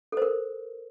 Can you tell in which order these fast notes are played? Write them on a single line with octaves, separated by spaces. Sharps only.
A4 C5 A#4